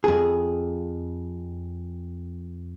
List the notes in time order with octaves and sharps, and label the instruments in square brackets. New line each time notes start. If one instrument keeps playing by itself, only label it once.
[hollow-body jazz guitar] F2 G#4